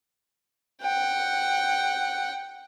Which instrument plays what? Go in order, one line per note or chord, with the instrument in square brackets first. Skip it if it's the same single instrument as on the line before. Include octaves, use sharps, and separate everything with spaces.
[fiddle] F#5 G5